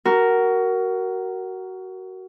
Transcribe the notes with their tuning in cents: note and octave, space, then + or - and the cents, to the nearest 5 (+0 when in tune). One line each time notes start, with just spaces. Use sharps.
F#4 +20 A#4 +0